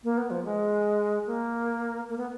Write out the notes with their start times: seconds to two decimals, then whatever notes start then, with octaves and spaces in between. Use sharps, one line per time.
0.04 A#3
0.18 B3
0.30 F3
0.45 G#3
1.27 A#3
2.09 A#3
2.18 B3